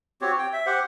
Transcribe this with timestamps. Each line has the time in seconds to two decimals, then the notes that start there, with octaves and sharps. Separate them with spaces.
0.21 C4 F#4 G4 C#5
0.38 G5
0.53 E5
0.66 G4 C5 F#5